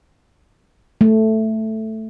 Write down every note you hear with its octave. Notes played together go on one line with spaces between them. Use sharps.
A3